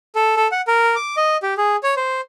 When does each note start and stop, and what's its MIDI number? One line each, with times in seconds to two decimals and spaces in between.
0.15 0.35 69
0.37 0.47 69
0.52 0.61 78
0.68 0.95 70
0.96 1.16 86
1.17 1.37 75
1.43 1.54 67
1.57 1.76 68
1.83 1.94 73
1.97 2.21 72